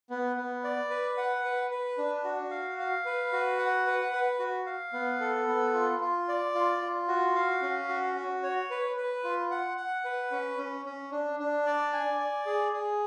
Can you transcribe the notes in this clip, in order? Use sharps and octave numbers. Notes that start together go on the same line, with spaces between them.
B3
B3
D5
B4
F#5
B4
B4
D4
F#4
F5
F5
B4
F#4
F#5
B4
B4
F#4
F5
B3
A4
B3
F4
F4
D5
F4
F4
F#4
F5
C#4
F#4
F#4
C#5
B4
B4
F4
F#5
F#5
B4
C#4
C#4
C#4
D4
D4
D5
G#5
D5
G#4
G#4